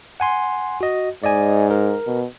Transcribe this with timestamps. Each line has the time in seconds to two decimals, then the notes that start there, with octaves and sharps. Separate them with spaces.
0.20 F#5 G#5 C6
0.81 F#4 D#5
1.23 G#2 D5 D#5 G#5
1.70 A#4
2.07 B2